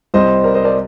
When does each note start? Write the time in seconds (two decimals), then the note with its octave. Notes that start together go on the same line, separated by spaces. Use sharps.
0.14 C2 C3 G3 C4 C5 D#5
0.44 A#4 D5
0.54 C5 D#5
0.64 A#4 D5